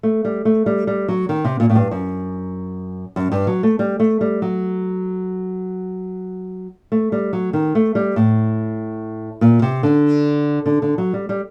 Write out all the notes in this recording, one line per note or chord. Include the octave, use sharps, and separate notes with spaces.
A3
G3
A3
G3
G3
F#3
D#3
C3
A#2
A2
G2
F#2
F#2
G2
F#3
A3
G3
A3
G3
F#3
A3
G3
F#3
D#3
A3
G3
A2
A#2
C3
D3
D3
D3
F#3
G3
G3